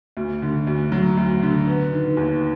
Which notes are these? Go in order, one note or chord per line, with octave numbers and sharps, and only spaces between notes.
D2
D3
D2
F#3
D2
D3
B3
D#3
D#2